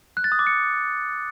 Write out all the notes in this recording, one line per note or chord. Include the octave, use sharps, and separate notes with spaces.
F#6
A6
D#6
D6
C#7